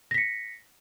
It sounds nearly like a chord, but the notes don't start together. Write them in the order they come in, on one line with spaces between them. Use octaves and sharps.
A#6 B6 C#7